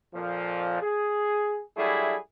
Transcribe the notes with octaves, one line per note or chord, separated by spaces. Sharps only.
F2 A#2 F3
G#4
F#3 G3 A3 D4 E4 G#4